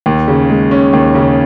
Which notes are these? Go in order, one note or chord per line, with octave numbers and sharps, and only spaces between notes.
D#2
C#3
G#3
C#4
D#2
C#3